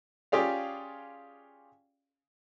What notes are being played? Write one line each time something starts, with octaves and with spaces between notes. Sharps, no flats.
C#4 F4 G4 G#4 D5 F5